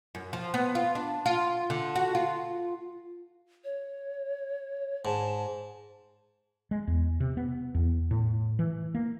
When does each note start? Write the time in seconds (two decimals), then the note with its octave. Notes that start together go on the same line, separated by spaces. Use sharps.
0.15 F#2
0.33 F3
0.54 B3
0.75 F4
0.95 D4
1.26 F4
1.70 D3
1.96 F#4
2.15 F4
3.64 C#5
5.05 G#2 A5
6.71 G#3
6.87 E2
7.20 C3
7.37 B3
7.75 E2
8.11 A2
8.59 E3
8.95 A#3